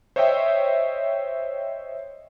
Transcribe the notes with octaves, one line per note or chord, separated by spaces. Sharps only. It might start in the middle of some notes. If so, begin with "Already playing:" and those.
C5 C#5 D#5 E5 G5